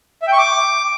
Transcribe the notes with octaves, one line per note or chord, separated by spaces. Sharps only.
E5
G5
C#6
D6